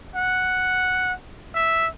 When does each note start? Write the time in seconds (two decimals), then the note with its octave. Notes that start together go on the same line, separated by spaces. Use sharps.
0.15 F#5
1.55 E5